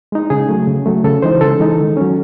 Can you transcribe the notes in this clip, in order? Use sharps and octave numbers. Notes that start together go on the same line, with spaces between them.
G#3 D#4
C#3 G#4
F#3 A3
C#3
F#3 A3
C#3 A4
E3 G#3 D#4 C5
C#3 A4
E3 G#3 D#4
D#3
F#3 C#4